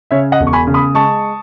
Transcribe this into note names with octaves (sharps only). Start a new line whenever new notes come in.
C#3 C#5 E5
D#5 F#5
E1
C#6
G#5 B5
C#3
B5 D#6
G#3 A5 C#6